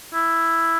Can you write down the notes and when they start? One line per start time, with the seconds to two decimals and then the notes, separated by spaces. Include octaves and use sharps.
0.14 E4